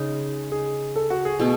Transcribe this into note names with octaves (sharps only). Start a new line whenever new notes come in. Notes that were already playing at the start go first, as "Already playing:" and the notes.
Already playing: C#3 G#3 D#4 G#4
G#4
A4
F#4
G#4
B2 A3 G#4